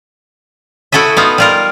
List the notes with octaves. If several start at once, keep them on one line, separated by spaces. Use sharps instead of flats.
E4 F#4 A4 D#5 E5
B3 D#4 F4
G3 F4 A#4